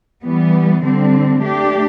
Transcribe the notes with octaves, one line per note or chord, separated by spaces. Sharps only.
E3 G3 B3
D3 G3 C4
A3 D4 G4